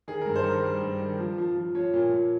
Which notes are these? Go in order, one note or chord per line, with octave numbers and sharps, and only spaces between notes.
D#3 G#4
G2 A#4
C5
D#3 A#4
G3
G2
D#3
F3
F3
F3
F3 C#5
A#2
A#2